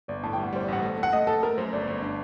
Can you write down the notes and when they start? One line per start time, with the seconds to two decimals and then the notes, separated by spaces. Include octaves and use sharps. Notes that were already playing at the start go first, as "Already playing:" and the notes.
0.08 G1 D5
0.23 A2 A5
0.33 G5
0.38 G3 F#5
0.53 G3 C5
0.63 D5
0.68 A1 F#5
0.83 A3
0.98 A3
1.03 F#5
1.13 A3 D#5
1.27 A3 A4
1.43 A3 A#4
1.58 F#2 C5
1.73 G1 D5
1.87 G1
2.02 D4